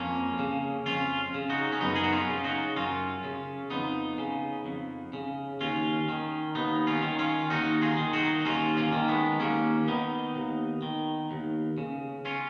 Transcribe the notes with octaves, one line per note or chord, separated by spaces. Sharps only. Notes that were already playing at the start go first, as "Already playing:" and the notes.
Already playing: F2 A#3 C#4
C#3
F2 C#4 F4
C#3
D#4 F#4
C#4
F#2 B3 D#4
G#4
F#4
C#4 F4
C#3
D#4 F#4
F#2 C#4 F4
C#3
F2 B3 D#4
C#3
F2
C#3
D#2 C#4 F4
D#3
D#2 B3 D#4
C#4 F4
D#3
C#4 F4
D#2 D#4 F#4
F4 G#4
D#3
D#4 F#4
D#4
D#2 C#4 F4
A#3 C#4
D#3
G#3 B3
D#2 A#3 C#4
D#3 B3 D#4
D#2
D#3
D#2
C#3
C#4 F4